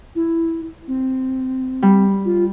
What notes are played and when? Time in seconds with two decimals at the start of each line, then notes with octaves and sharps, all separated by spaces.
0.15 E4
0.88 C4
1.82 G3
2.25 F4